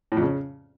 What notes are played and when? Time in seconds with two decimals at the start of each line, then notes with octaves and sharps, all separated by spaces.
0.12 A2
0.17 F2
0.22 C#3